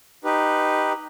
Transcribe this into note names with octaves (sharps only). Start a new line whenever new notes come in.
D#4 G4 B4